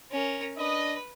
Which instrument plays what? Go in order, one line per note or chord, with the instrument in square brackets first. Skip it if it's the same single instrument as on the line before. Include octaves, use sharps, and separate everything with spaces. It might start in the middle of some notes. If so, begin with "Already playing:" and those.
[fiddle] C#4 A#4
[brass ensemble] D4 D#5 [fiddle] B4